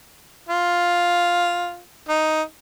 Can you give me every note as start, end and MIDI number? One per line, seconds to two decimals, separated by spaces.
0.49 1.80 65
2.09 2.42 63